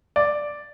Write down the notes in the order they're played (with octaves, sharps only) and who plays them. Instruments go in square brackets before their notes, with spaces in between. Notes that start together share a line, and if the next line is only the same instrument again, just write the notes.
[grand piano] D5